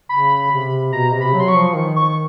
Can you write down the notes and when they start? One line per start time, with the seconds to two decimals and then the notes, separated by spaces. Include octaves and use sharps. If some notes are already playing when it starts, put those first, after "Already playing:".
0.09 C#3 B5
0.51 C3
0.92 B2 A#5
1.14 C3
1.21 B5
1.34 F#3
1.40 C6
1.48 C#6
1.54 F3
1.76 D#3
1.96 C#6